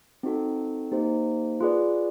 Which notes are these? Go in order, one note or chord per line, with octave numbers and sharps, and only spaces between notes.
C4 D#4 F#4 A4
A#3 D#4 G4 C5
F4 G#4 B4 D5